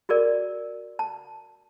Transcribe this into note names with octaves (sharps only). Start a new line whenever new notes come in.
F#4 G#4 A#4 D5
A5